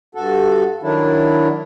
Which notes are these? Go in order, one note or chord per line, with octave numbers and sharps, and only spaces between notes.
G2 F#4 A4
D#3 F#3 D4 E4